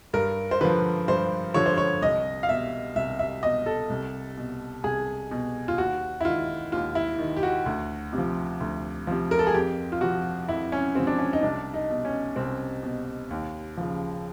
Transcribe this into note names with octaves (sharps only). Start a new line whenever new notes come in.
G2 A#4
C5
D3 F3 B4
G2 C5
D3 F3 C#5
C5
C#5
C2 D#5
F5
B2 E5
C2 E5
E5
B2 D#5
A4
C2
B2
C2 G#4
B2
F4
D#2 F#4
E4
D#3 F4
D#2 F4
E4
D#3
G4
F#4
D2
C3
F3
D2
C3 F3
A#4
A4
G#4
F2 G4
F4
C3 F3 F#4
F2 E4
C#4
C3 F3 C4
D4
C#4
D#4
C2 D4
D#4
B2
C#4
C2 C4
B2
D#2
C#3 F3